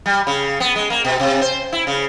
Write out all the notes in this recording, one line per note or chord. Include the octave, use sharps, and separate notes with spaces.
G3
C#3
B3
G#3
A#3
B2
C3
C5
E4
C#3